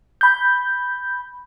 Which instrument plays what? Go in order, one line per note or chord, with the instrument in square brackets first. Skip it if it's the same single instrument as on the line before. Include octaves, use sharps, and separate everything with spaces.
[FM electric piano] B5 G6